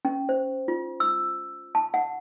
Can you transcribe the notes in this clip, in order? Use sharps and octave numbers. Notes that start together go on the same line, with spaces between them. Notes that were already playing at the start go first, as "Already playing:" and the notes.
C#4
C5
F4
E6
A5
F#5